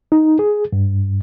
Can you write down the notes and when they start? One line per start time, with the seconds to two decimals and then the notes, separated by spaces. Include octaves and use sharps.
0.12 D#4
0.39 G#4
0.73 G2